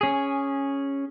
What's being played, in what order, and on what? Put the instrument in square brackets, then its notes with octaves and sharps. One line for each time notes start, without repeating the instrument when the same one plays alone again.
[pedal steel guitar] C#4 G#4